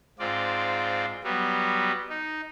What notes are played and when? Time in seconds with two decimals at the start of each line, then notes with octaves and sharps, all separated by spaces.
0.19 G#2 C4 F4 D5
1.24 F#3 G3 B3
2.09 D#4